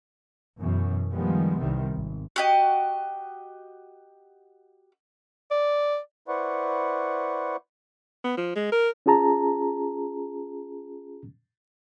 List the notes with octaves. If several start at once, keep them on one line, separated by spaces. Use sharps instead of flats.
F#2 B2 E3
D#3 F3 G3 G#3 B3
C2 C3 D#3 G3
G#1
F#4 G4 D#5
D5
E4 B4 C5 D5 F#5 C#6
B3
F3
G#3
A#4
C#4 F4 G#4 A5 A#5